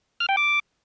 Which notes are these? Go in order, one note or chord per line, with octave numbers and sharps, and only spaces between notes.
F6
G5
D6